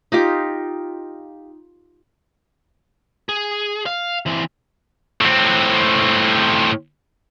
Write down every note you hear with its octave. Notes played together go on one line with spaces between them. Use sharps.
D#4 F4 G4
G#4
F5
E3 C4
A2 C4